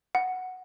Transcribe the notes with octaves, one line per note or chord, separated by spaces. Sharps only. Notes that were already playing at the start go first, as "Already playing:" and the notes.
F#5